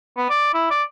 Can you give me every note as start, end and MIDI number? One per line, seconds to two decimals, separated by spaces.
0.17 0.28 59
0.30 0.51 74
0.54 0.67 64
0.70 0.83 74